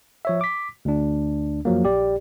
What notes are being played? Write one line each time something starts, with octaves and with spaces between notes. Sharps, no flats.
F3 C#5 E5
D6 B6
D2 D4
F#2 F3 F#3 A#3
A#1 G4 D5